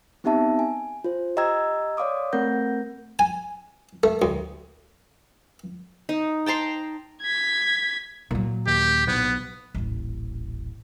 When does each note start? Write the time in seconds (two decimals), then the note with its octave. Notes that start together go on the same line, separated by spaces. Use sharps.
0.24 B3 C4 D#4 G4 E5 A5
0.59 G#5
1.04 F4 C5
1.37 G4 D#5 G5 A#5 E6 G#6
1.97 C#5 D5 F5 C6 D6 D#6
2.33 A3 C4 A#4 F#5 G6 A#6
3.19 G#5
4.03 A3
4.22 D2
6.09 D#4
6.46 G5 A5 A#5 C6
7.22 G#6 B6
8.31 A#2 F#3
8.67 D#2 G4
9.07 B1 B3
9.74 D#1 A1